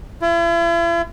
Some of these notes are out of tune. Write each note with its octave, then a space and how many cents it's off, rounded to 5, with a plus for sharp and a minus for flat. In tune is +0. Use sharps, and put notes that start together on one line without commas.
E4 +45